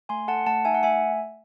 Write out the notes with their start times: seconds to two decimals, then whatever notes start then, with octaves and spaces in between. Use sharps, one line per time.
0.09 A3 G#5 C6
0.28 A4 F#5 A5
0.46 A3 F#5 A5
0.65 D#4 E5 G#5
0.74 F#5
0.83 A3 E5 G#5